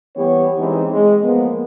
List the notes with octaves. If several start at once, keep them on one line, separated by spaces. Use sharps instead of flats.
E3 G3 B3 G4 C#5
E3 G#3 C4 D#4
G#3
F3 A#3 B3